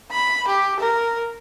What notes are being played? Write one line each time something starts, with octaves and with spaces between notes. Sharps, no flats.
B5
G4
A#4